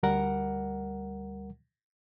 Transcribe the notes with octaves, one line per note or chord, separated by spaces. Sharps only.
D2 G3 A#4 F#5